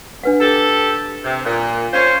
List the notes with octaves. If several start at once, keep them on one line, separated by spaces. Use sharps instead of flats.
D4 B4 F#5
G4 A4
C3
A#2
C#4 C5 F5